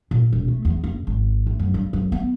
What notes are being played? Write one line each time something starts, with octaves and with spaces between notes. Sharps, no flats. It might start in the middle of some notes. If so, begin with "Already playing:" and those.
A#2
E1
A3
E2
F#1
G#1
A2
F#2
G2
F#2
B3